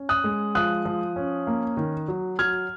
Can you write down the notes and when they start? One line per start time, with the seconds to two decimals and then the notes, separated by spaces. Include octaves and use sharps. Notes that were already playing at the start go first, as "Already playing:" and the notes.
Already playing: C#4
0.09 D#6 F#6
0.24 G#3
0.55 F3 D#6 F#6
0.85 F3
1.16 C#4
1.47 A#3
1.77 D#3
2.08 F#3
2.39 F#3 F6 G#6